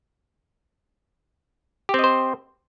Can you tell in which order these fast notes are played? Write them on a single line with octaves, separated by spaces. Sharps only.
G4 C4 D#5 C5